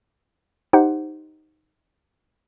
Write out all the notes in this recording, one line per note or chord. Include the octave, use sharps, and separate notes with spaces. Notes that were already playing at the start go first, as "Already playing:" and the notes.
D#4 G4 C5 F#5